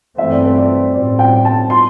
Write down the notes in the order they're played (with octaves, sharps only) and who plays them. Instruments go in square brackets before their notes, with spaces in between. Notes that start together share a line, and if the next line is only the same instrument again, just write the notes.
[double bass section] G2 E3 A3 C4 [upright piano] E5
[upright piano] D5
C5
D5
[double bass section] A2 G3 C4 [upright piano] D5
[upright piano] G5
A5
C6